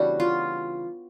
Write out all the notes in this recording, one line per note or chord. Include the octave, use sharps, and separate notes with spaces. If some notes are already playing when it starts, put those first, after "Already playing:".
Already playing: C#3 E3 G3 B3 D4 F#4
F4